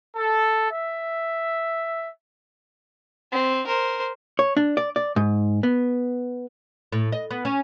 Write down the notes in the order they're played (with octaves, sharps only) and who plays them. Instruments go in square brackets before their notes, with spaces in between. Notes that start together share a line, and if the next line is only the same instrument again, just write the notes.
[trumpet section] A4
E5
[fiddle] C4
A#4 C5
[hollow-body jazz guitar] C#5
D4
D5
D5
G#2
B3
[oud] A2
D#5
B3
C#4